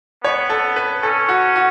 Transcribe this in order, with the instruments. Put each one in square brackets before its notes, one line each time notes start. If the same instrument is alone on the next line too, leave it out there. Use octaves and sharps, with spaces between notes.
[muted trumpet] B3 [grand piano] C#5
[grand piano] A4
B4
[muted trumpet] C#4 [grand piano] A4
[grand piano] F#4
F#4